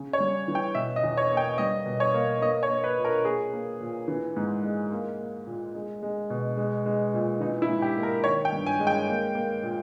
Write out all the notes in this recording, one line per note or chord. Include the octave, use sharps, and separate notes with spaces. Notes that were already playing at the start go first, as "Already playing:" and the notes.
Already playing: C#3
C#5
G3
E3
G5
B2 E5
D#5
E2
C#5
A#3
G5
G3 D#5
B2
C#5
A#3
A#3 D#5
C#5
A#3
B4
A#2
A#4
A#3 G#4
A#3
A#2
E3
G#2
G#3
A#3
A#3
A#2
G#3
G#3
B2
G#3
G#3
A#2
E3 D#4
E4
G#2
G4
A#3
A#4
D#3 C#5
G5
G2
G#5
G#3
G5
A#3
A#3
A#2